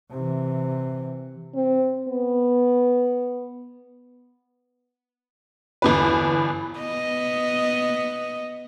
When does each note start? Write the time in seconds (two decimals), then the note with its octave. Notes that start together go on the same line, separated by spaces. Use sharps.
0.11 C3 E3
1.55 C4
2.08 B3
5.82 G1 E2 B4
6.79 B3 D#5